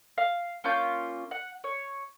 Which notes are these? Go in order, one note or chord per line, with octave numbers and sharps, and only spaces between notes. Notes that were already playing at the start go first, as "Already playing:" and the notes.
F5
A#3 C#4 F4 G6
F#5
C#5